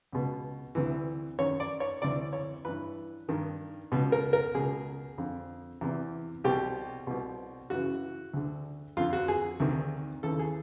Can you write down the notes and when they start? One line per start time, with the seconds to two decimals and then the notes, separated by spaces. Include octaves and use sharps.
0.13 C#2 B2
0.75 D2 C3 E3
1.39 F#2 D#3 C#5
1.60 D5
1.80 C#5
2.02 D2 C3 E3 D5
2.33 C#5
2.65 G2 E3 B4
3.29 G2 D#3
3.92 C#2 B2
4.12 A#4
4.33 A#4
4.55 C#2 B2 G#4
5.18 F2 D3
5.81 E2 C3 E3
6.44 C2 B2 G4
7.07 C2 B2
7.70 F#2 C#3 E3 F#4
8.34 D2 D3
8.97 F2 D3 F4
9.13 F#4
9.28 G#4
9.60 D2 C3 D#3
10.23 D#2 C#3 E3 A4
10.39 G#4